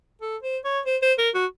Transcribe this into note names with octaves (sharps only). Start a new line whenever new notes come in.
A4
C5
C#5
C5
C5
A#4
F#4